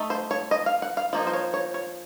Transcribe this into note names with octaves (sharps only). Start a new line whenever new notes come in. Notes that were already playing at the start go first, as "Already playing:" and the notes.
Already playing: A3 D#4
C5
C#5
D#5
F5
F#5
F5
F3 A#3 D#4
C5
C#5
C#5
C#5